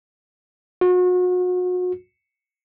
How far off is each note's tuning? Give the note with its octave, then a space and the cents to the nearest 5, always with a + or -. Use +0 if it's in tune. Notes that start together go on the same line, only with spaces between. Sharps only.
F#4 -35